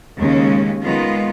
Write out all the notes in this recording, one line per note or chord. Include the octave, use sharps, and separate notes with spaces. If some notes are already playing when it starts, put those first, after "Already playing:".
D#2 C#3 G#3 C#4
D#3 G#3 B3 F4